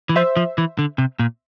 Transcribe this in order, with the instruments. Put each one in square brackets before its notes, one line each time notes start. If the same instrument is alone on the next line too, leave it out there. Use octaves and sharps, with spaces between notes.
[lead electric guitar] E3
[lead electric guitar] F3 [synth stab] C5 E5
[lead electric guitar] F3
E3
D3
C3
A#2